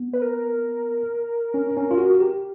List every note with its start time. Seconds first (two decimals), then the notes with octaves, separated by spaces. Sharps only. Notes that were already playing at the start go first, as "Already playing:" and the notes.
Already playing: B3
0.13 B4
0.22 A#4
1.54 C#4
1.77 C#4
1.91 F4
1.98 F#4
2.20 G4